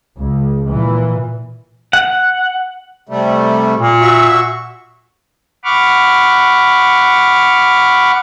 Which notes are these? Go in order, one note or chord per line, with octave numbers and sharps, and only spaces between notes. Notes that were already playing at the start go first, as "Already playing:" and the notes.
C#2
A#2 E3
F#5
C3 G3 A3
A#2
F#4 E5 C#6
F#5 B5 C#6 D6 F6